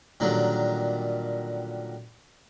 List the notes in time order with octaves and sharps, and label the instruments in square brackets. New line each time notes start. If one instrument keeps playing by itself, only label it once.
[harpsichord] A#2 D3 D#3 F#3 G3